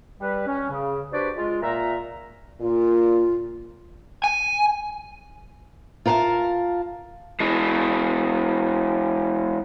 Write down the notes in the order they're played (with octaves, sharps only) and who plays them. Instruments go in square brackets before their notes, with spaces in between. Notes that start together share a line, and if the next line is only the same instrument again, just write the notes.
[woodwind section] G3 B4
C#4
C#3
D4 F#4 G4 B4 C5 D5
G#3 F4
A#2 E5 A#5
[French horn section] A#2 [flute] F4
[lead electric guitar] G#5
[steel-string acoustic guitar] F4 A#4 F5 F#5 A5
[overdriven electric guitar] E3 G#3